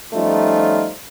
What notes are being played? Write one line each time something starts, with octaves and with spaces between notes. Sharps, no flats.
F3 G3 A3 C#4 D#4 F4